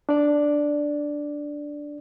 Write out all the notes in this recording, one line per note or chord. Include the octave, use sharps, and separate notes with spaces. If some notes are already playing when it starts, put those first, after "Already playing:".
D4 D5